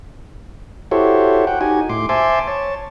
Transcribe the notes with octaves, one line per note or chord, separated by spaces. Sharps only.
E4 F#4 G4 A4 C5 C#5
F#5 G5
D#4 F#4 G4 G#5
A2 C6 D6
C5 E5 G#5 A5 C6 D6
C#5 A5